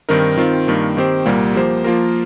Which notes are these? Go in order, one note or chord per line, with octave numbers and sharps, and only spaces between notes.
G2 D#3 C4 D#4 A#4
D#3 C4 F4
G2 D#3 A#3
D#3 C4 G4 C5
C2 A#2 G3 A#3
F3 A#3 G4 C5
F3 A#3 F4 A#4